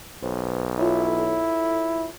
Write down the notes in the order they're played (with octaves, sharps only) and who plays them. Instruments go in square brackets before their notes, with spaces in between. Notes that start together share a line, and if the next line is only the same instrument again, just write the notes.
[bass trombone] B1 [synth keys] B4 C5
[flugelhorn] E4 [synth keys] F4 A4 C#5